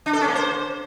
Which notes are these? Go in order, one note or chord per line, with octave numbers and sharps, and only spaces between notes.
D4
A4
C#4
A#3
C5